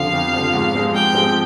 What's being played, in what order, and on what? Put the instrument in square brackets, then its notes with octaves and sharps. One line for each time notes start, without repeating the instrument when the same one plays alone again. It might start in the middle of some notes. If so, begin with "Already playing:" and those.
Already playing: [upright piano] F2 D3 F3 [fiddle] F5
[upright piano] F2
D3 F3
G#2
F3 G#3 C4
[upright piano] G#2 [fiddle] G5
[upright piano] F3 G#3 C4